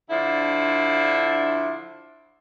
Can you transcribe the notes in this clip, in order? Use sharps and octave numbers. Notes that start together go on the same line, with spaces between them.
D3 F3 D4 E4